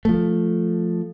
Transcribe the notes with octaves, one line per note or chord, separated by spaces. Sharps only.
F3 A3